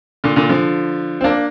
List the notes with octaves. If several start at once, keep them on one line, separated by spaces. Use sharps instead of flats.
A#2 D3
A#2 D3
D3 F3
C4
A#3 D4